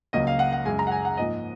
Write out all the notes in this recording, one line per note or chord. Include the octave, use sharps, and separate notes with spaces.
C#2 C#3 F#3 A#3 D#5
F5
F#5
F#5
F#2 C#3 G#3 G#5
A#5
F#5
G#5
F#5
G#2 F3 A#3 D#5